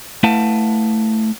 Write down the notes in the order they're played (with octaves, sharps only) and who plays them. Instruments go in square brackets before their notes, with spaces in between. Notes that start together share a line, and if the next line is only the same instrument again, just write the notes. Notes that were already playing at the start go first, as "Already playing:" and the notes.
[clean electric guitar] A3 E4 B4 F5 F#5 A5